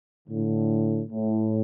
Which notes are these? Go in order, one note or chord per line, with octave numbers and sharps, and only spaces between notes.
A2 D3
A2